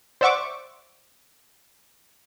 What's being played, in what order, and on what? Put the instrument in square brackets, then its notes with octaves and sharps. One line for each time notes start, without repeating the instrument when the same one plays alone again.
[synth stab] C5 D5 E5 F#5 C#6 D6